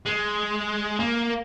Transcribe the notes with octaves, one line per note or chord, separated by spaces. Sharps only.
G#3
A#3